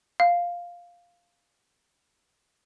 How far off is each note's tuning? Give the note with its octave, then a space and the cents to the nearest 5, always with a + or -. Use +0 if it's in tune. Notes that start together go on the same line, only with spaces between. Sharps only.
F5 +0